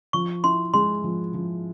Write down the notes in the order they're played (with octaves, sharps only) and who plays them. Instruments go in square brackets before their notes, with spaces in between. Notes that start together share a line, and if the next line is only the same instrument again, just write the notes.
[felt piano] F3 [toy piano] C#6
[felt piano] E4 [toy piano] C6
[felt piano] G#3 [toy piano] C6
[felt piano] F3
F3